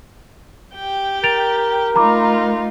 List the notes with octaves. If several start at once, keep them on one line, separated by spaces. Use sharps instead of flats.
G4 G5
A#4 A6 D7 F7
A3 D#4 F4 A#5 B5 D6